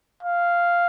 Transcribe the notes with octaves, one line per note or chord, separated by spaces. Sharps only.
F5